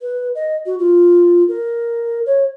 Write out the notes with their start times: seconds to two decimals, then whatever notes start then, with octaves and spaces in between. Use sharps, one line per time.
0.02 B4
0.35 D#5
0.66 F#4
0.79 F4
1.48 A#4
2.26 C#5